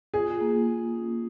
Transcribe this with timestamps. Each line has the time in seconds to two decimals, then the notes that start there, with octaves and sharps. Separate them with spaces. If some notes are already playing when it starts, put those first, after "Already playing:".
0.14 F4 G#4
0.41 A#3
0.68 A#3
0.95 C#4